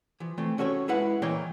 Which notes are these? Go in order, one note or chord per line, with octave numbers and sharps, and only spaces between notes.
E3 F3
E3 A3 C4
C#4 F#4 A4 C5 C#5
G#3 E4 B4 F#5
A#2 E3 A#3 C#5 D#5 G5